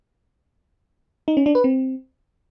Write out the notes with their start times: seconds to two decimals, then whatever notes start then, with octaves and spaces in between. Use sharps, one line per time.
1.28 D#4
1.37 C#4
1.46 D4
1.55 B4
1.64 C4